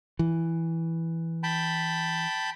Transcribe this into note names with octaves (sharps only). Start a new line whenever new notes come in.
E3
G5 A5 B5